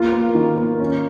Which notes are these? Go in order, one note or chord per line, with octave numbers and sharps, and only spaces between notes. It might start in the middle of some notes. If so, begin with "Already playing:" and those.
Already playing: A#3 F4
A#3
D#3
A#3
C#4